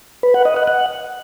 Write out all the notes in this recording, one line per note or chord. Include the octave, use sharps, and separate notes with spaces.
B4
F#5
D#5
F#5
F#5